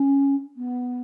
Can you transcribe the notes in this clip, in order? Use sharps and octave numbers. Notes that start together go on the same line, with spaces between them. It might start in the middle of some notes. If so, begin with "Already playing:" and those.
Already playing: C#4
B3